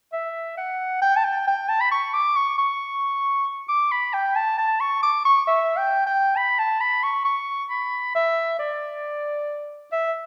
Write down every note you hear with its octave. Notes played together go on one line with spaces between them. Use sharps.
E5
F#5
G5
A5
G5
G5
A5
B5
C#6
D6
C#6
C#6
D6
B5
G5
A5
A5
C#6
D6
C#6
E5
G5
G5
B5
A5
B5
C#6
C#6
B5
E5
D5
E5